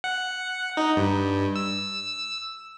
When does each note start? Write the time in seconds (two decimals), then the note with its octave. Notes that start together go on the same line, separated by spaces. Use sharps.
0.04 F#5
0.77 D#4
0.96 G2
1.56 E6